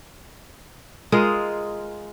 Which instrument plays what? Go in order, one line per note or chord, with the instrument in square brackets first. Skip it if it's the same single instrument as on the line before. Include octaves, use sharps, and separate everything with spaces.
[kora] G#3 F4 A#4 D#5